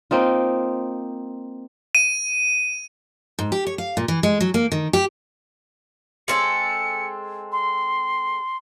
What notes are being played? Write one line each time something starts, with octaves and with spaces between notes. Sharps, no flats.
A#3 C4 D#4 F4
D#7
G#2
G4
C#5
F5
A#2
E3
G#3
F#3
A#3
D#3
G4
G#3 C4 A4 C#7
C6